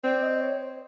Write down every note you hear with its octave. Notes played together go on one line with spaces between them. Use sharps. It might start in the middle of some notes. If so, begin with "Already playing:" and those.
C4 D5
D#5
C#5
C5